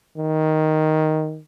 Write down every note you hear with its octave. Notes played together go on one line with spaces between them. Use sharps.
D#3